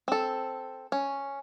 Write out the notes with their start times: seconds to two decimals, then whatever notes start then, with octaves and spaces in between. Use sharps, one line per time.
0.08 C4 A4
0.92 C#4